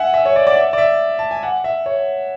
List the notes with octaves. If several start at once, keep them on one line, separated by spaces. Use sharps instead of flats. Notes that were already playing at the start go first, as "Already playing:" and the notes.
Already playing: E5 F#5 G#5
E5
C#5
D5
D5
E5
D5
E5
A5
G#5
F#5
E5
C#5